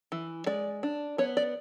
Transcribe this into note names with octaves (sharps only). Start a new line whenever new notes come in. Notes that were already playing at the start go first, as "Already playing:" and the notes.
E3
G#3 D5
D4
B3 C#5
D5